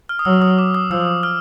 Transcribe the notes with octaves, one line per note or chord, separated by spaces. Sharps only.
F6
D#6
F#3 E6
D#6
D6
D#6
F3 E6
F6